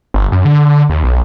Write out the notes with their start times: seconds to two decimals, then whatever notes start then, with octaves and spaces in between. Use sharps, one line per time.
0.14 G1
0.32 F#2
0.45 D3
0.89 D#2
1.04 B1